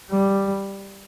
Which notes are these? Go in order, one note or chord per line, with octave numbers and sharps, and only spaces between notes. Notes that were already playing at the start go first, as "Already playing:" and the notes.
G3